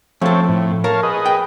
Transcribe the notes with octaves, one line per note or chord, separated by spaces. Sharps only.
F3 A3 C4 A4 C#5
A2
A#4 C#5 F5 A5
G#4 B4 D#5
G5